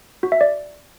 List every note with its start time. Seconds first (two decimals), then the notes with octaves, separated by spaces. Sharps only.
0.23 F#4
0.32 E5
0.41 D5